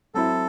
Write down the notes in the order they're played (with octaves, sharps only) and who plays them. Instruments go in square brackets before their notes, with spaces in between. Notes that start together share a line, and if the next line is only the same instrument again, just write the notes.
[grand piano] F#3 C4 E4 [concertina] A4